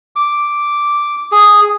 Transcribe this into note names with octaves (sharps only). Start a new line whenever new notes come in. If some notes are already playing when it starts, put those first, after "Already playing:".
D6
G#4